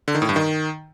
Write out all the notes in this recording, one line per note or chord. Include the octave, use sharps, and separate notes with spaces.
D3
D#3
A2
G2
D#3